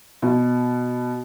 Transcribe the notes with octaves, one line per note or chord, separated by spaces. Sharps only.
B2